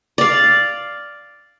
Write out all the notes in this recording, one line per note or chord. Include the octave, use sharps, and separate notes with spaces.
D5 F5